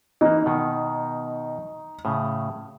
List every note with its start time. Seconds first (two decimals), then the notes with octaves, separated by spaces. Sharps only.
0.21 E3 A#3 D#4
0.46 B2 D#3
2.05 A2 C#3